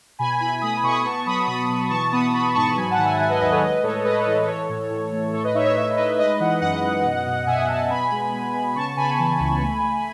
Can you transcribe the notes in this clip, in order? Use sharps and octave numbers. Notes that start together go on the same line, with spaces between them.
B2 G#5 B5
E4 G#5 B5
A3 B5 D#6
B5 D#6
B2 C#6
B5 D#6
B3 A5 C#6
F#3 B5 D#6
B2 B5 D#6
B2
E3 A5 C#6
B3 B5 D#6
B3 B5 D#6
G#2 A5 C#6
F#3 G#5 B5
F#5 A5
D#3
E5 G#5
D#3 E5 G#5
B4 D#5
D#2 B4 D#5
A4 C#5
G#3 B4 D#5
A2 A4 C#5
G#3 B4 D#5
A4 C#5
E3
A4
E3 A4 C#5
A2
A2
A3
A2 A4 C#5
B4 D#5
D#4 C#5 E5
C#5 E5
A2 C#5 E5
D#4 B4 D#5
G#3 B4 D#5
E3 D#5 F#5
F#2 D#5 F#5
F#2
B2
B2
B2 E5 G#5
B2 F#5 A5
B3 G#5 B5
G#3
G#3
B3
C#3 A5 C#6
C#3 G#5 B5
E3
C#2
A3
A3